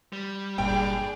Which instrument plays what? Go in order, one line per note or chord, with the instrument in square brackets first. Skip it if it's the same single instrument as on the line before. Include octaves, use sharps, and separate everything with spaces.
[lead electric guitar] G3
[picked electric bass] G1 G2 A#2 [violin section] D4 G#4 D5 [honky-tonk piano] G5